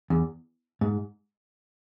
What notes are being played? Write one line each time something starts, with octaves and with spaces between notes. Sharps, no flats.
E2
G#2